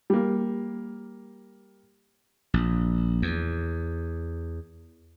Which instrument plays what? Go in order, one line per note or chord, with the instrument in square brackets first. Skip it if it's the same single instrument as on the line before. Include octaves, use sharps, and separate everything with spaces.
[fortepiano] G3 A#3
[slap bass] A#1
E2